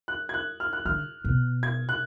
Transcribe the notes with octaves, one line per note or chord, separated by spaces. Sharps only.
F#6
G#6
F#6
F6
F#6
D3 F6
B2
G#6
F#6